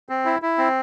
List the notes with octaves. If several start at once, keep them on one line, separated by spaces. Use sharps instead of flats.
C4
E4
E4
C4